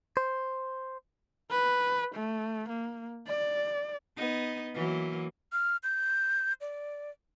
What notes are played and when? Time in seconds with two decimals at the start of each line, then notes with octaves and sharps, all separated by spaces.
0.17 C5
1.51 B4
2.15 A3
2.69 A#3
3.27 D5
4.17 B3 D#4
4.74 E3 F#3 A#3
5.52 F6
5.83 G6
6.61 D5